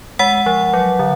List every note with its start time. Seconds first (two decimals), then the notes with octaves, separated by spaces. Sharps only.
0.19 G#3 F#5
0.46 F3
0.73 F#3
0.99 D3